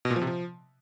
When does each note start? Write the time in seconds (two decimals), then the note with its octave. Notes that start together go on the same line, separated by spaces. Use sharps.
0.05 B2
0.10 A#2
0.16 F3
0.22 C3
0.27 F3